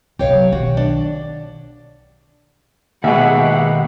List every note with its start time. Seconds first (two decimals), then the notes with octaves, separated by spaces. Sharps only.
0.19 C2 A2 G4 C#5 F5
0.33 F#3 A#3
0.52 B1 D#3 F#4
0.77 D4
3.04 D#2 B2 G#3 G4 E5 F#5